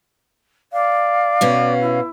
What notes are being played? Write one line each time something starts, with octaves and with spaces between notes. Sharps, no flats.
D5 F5
B2 C#4 F#4
E4